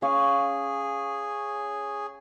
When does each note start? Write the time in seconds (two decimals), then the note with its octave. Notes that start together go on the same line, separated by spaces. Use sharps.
0.02 C#4 G#4 F5 C#6